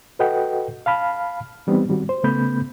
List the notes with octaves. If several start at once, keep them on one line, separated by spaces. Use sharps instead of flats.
F#4 A4 B4 D#5 F#5 G5
F5 A5 B5 F6
E3 G3 B3 C4 D#4
D#3 G3 C4 F#4
C5
C#3 A3 B3 B5 G6